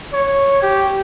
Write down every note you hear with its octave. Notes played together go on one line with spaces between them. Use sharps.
C#5
G4